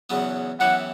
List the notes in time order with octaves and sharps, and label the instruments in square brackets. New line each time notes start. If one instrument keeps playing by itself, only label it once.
[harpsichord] E2 C#3 F#3 B3
[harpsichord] F#2 E3 B3 E4 G4 [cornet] F#5